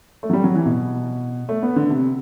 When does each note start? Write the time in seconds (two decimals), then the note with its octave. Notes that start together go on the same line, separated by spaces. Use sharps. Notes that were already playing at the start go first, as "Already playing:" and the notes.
0.23 A3
0.30 F#3
0.33 G3
0.44 F#3
0.55 E3
0.65 B2
1.49 A3
1.62 B3
1.76 D3
1.90 C3